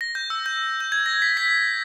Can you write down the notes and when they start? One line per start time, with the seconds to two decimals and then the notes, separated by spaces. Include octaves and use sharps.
0.01 A#6
0.15 G6
0.30 E6
0.46 G6
0.80 G6
0.92 G#6
1.06 A#6
1.22 B6
1.37 B6